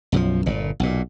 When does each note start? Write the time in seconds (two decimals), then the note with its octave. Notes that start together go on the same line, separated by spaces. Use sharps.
0.12 B1 F#2 D#3 F3
0.46 G1 A#2
0.80 B1 A#2